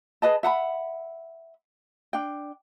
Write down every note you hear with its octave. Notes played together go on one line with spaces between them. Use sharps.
G#4 B4 D#5 A5
E5 F#5 A5 B5
D4 G5